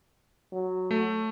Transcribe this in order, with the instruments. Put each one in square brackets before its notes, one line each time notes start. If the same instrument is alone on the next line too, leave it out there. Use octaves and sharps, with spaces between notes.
[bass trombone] F#3
[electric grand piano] A3